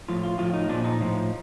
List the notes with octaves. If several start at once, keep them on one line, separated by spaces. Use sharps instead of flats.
A2 F3 F4
F4
A2 F3 F4
D#4
A#2 F3 D4
D#4
A2 F3